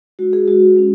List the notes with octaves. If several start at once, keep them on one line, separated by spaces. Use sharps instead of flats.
G#3 E4 F#4
G#4
G#3 E4 F#4
G#3 C#4